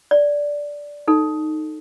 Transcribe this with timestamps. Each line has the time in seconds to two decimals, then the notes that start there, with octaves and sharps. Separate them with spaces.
0.11 D5
1.08 D#4 A4